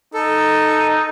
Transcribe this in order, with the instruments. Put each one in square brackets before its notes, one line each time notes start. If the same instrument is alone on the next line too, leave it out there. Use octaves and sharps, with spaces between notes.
[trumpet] D#4 [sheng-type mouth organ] A4